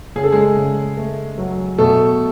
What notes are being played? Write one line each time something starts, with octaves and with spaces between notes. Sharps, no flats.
C#3 G#4
A4
G#3 G#4
C#3
A3
F#3
B2 A3 A4